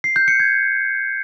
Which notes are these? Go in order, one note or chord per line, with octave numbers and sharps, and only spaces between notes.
C7
G6
C#7
G#6